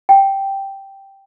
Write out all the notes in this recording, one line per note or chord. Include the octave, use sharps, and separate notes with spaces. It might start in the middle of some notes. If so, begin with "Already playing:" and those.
G5